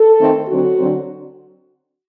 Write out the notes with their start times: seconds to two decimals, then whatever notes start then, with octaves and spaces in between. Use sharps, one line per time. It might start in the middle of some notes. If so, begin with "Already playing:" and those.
Already playing: A4
0.20 D#3 A3 C4
0.48 D3 F#3 C4 F#4
0.78 D3 F#3 C4